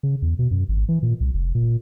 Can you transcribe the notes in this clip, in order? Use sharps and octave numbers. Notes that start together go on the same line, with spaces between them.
C#3
E2
B2
F#2
G#1
E3
A#2
C2
F1
A#2